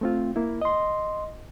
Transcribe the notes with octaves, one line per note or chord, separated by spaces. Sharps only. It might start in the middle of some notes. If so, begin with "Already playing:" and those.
A3 C4 F4
A#3 E4
D#5 C6